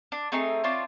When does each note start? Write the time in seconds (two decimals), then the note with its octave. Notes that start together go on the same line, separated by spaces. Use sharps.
0.12 D4
0.32 A3 C4 D#4 G#4
0.64 C4 D4 F4 C#5